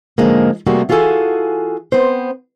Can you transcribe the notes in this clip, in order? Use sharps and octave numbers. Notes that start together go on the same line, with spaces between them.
G#2 D3 F3 G#3 A#3
C3 G3 A3 A#3 F#4 G#4
E3 F4 F#4 G#4 A4 G#5
B3 C4 C5